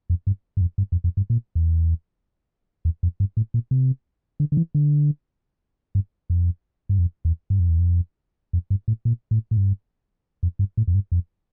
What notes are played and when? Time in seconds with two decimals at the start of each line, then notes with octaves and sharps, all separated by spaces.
0.10 F2
0.27 G2
0.57 G2
0.61 F2
0.78 G2
0.92 F2
1.04 F2
1.17 G2
1.30 A#2
1.55 E2
2.85 E2
3.03 F2
3.20 G2
3.37 A2
3.54 A#2
3.71 C3
4.40 D3
4.52 D3
4.57 E3
4.75 D3
5.95 G2
6.30 F2
6.89 G2
6.99 F2
7.25 E2
7.50 G2
7.60 F2
7.69 E2
7.79 F2
8.53 F2
8.70 G2
8.88 A2
9.05 A#2
9.31 A2
9.51 A2
9.57 G2
10.43 F2
10.59 G2
10.77 A2
10.87 F2
10.95 G2
11.12 F2